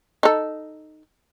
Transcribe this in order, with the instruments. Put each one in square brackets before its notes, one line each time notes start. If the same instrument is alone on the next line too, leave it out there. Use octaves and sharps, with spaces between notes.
[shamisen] D#4 A4